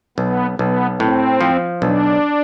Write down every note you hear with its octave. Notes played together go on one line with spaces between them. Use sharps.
B1 B3
B1 B3
A2 C4
F3
B1 D4